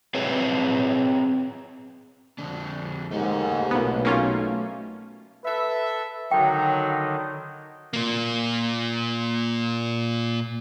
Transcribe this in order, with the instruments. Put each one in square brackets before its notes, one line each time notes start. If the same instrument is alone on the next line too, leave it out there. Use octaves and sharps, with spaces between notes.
[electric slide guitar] C4 G#4 B4 C#5
F2 D3 D4
[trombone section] D#2 G#2 [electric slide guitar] A3 A4 F#5
[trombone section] B1 [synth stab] A#2 B3
[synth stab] A#3 C#4 F4
[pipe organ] A4 [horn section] B4 E5
[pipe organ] D3 D#3 D#4 [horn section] F#3 [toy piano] G5
[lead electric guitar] A#2 A#3